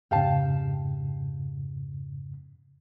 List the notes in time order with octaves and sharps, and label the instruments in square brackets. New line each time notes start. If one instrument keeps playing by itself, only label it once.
[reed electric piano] F2 G#2 C#3 [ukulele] G4 F5 A5